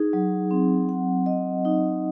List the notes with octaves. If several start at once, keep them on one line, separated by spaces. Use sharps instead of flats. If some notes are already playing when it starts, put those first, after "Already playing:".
Already playing: D#4 G#4
F#3
C4
F#5
D#5
D#4